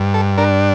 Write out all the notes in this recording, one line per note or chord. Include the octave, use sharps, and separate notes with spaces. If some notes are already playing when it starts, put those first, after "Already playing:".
Already playing: G2
A4
D4 A#4